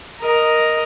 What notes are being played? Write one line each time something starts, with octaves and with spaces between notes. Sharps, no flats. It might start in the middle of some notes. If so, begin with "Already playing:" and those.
A#4 D#5